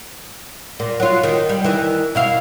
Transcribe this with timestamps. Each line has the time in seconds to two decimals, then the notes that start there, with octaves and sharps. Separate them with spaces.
0.80 A#2
1.00 F#3 F4
1.23 D#3
1.49 G3
1.64 D#3 E3
2.15 B2 E4 F5